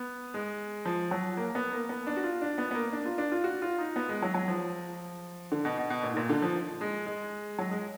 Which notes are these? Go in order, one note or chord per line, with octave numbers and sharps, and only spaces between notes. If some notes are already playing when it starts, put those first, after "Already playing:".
Already playing: B3
G#3
F3
F#3
A#3
B3
A#3
B3
D4
F#4
F4
D4
B3
B3
A#3
D4
F4
D4
F4
F#4
F4
D#4
B3
G#3
F#3
F#3
F3
D3
B2
B2
B2
A#2
G#2
A#2
D3
F3
G#3
G#3
F#3
G#3